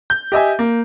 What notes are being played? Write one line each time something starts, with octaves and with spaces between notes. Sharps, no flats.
G6
G4 D#5 E5 G#5
A#3